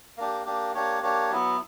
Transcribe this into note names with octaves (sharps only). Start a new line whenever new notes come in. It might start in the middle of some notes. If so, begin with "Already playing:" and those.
A#3 D4 G4
A#3 D4 G4
A#3 D4 G4 C#5
A#3 D4 G4 C#5
F#3 B3 E4